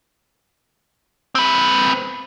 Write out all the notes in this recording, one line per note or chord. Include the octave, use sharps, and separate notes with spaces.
C4 B4